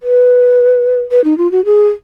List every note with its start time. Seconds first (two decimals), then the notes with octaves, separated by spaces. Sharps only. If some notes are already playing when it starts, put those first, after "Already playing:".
0.03 B4
1.11 B4
1.24 D#4
1.38 F4
1.51 F#4
1.65 G#4